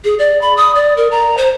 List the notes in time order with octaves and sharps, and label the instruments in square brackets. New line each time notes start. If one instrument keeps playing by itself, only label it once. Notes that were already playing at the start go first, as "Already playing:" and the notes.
[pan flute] G#4
D5
B5
D#6
D5
A#4
A#5
C5